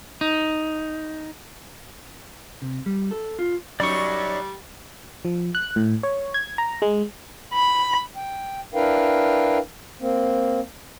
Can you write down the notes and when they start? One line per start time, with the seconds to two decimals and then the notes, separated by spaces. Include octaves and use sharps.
0.21 D#4
2.62 C3
2.86 G3
3.11 A4
3.39 F4
3.80 F#2 F#3 G3 D#4 D5 C#6
5.25 F3
5.55 F#6
5.76 A2
6.03 C#5
6.34 G#6
6.58 A#5
6.82 G#3
7.54 B5
8.14 G5
8.75 D4 E4 A#4 B4 F5 G5
10.01 A#3 C4